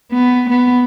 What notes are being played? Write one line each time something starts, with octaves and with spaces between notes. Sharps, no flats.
B3
B3